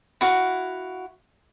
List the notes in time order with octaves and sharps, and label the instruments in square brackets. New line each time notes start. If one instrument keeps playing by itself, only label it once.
[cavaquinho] E4 F#4 F5